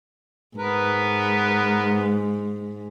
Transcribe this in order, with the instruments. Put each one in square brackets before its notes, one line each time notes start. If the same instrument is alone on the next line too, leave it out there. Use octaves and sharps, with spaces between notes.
[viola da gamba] G#2 [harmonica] B3 A#4 B4